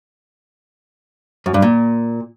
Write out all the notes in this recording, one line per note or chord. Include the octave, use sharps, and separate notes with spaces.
F#2
G2
A#2